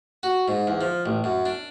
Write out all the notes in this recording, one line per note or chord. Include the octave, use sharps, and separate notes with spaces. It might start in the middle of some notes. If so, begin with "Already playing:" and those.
F#4
G#2
E2
F3
A1
F#2
D4